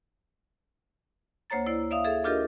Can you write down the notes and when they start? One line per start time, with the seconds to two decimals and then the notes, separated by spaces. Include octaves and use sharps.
1.50 D2 A#3 C5 C#5 A#5 A6
1.67 E4 C5 D5
1.91 D5 E5 F5 D#6
2.04 G#4 A4 E5
2.24 D4 F4 G4 A4 A#4 D#5